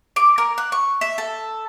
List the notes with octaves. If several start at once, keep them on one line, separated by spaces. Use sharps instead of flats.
D6
A#4
F#6
C#6
E5
A4